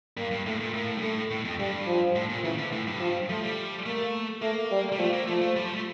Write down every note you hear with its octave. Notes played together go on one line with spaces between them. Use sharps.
G2 A#3
G2
A2 A3
A#2
A2 A#3
G2
A2 A3
A2
F2
G2 G3
F3
A2
A#2
C#3 E3
D3
A2
G2
F3
F3 A3
G3
A3 A#3
A3 A#3
G3
G3
F3 A3
A#3
F3 A3
A3
G3
F3
A3